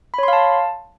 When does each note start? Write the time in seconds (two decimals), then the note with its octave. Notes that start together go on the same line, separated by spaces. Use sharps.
0.14 B5
0.18 C#5
0.23 C6
0.28 F5
0.33 A5